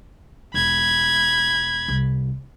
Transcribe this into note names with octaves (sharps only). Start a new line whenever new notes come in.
E1 B5 G#6
C2